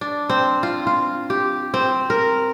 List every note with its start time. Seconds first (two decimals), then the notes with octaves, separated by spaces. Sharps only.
0.01 D4
0.30 C4
0.63 F4
0.87 F4
1.30 G4
1.74 C4
2.10 A#4